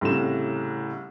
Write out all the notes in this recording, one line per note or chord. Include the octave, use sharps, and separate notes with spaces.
C2 A2 C#3 E7